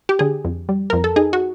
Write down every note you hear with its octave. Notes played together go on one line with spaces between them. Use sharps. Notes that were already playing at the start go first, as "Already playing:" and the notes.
G4
D3 G#4
F2
G3
F2 A#4
A4
D#4 G#4
F#4